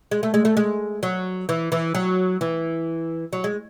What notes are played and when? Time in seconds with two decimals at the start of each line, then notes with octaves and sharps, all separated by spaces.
0.11 G#3
0.23 A3
0.34 G#3
0.45 A3
0.57 G#3
1.03 F#3
1.49 E3
1.72 E3
1.95 F#3
2.41 E3
3.33 F#3
3.44 G#3